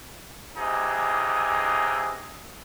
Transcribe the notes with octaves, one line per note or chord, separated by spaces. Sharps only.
C#2 C3 E3 D#4 G#4